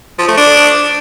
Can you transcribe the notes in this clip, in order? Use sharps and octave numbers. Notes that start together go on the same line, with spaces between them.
F3
A3
D4